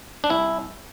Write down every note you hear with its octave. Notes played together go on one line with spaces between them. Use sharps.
D4
C2 E4